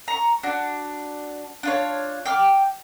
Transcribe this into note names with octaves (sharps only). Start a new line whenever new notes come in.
A#5 C#6
D4 F#4
D4 F4 C#5
G5 D6 F6